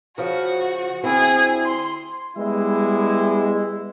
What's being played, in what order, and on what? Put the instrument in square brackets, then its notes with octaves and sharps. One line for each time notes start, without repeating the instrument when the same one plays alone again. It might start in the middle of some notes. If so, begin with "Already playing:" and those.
[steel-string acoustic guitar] C#3 F3 [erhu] F#4
[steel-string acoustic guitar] D2 C4 E4 [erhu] G#4
[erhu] C6
[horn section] G3 G#3 B3 E4